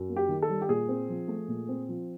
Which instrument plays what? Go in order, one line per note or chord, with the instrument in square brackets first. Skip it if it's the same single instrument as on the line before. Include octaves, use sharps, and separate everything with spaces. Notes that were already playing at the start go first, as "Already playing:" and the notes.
Already playing: [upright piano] F#2
A#3
G4
D#3
A4
G3
G4
A#2 G#4
C4
F3
A3
A#2
C4
F3